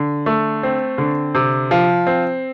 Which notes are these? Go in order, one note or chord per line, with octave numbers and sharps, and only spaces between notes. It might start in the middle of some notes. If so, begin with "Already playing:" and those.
Already playing: D3
A3
C4
D3
C3
F3
C4